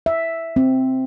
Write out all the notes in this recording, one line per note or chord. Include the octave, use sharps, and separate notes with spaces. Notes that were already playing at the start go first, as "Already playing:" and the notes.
E5
C4